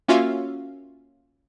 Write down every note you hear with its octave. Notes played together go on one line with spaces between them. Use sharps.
A#3 C#4 F4 F#4 E5 F5